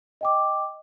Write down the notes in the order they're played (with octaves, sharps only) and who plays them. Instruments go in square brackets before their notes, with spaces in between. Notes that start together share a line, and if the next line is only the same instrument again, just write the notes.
[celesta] D#5 G5 D6